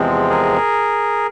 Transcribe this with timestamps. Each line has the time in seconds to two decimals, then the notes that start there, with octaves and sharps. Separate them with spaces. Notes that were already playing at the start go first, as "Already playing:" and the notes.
Already playing: E2 C3 F3 G#3 C4
0.30 G#4 A#4